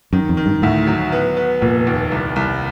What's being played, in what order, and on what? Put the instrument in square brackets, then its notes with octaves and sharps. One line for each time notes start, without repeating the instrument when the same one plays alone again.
[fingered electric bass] F#2 [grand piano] D#3
[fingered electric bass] F2
[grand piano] D#3
[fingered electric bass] G2
[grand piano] D2 [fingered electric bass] A2
[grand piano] F#3
B3
B3
[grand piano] F1 [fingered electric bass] A#2
[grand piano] D#2
C2
C2